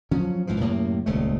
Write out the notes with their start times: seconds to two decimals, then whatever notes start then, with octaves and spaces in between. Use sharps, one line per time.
0.11 F3 F#3 C#4
0.47 A#1 G#2 E3 F3
0.60 F#2 A2 C3 A#3
1.06 D#1 C#2 C#3 A3